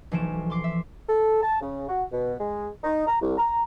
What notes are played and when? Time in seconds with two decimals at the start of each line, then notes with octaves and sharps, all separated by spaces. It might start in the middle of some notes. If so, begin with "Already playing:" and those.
0.11 B1 E3 F3 A3 D7 E7
0.50 C6 D6 C7
0.64 E5
1.09 A4
1.42 A5
1.61 C#3
1.88 F#4
2.12 B2
2.39 G#3
2.83 D#4
3.07 A#5
3.21 C2
3.38 A#5